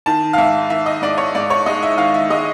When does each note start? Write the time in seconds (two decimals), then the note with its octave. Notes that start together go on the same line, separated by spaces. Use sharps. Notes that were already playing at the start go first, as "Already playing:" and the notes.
0.06 D#3 A5
0.33 F5
0.37 G#2 E5
0.70 D#3 E5
0.86 D#5
1.02 G#2 D5
1.18 C#5
1.35 G#2 D5
1.50 C#5
1.66 G#3 D#5
1.83 E5
1.98 D#3 F5
2.14 E5
2.30 G#3 D#5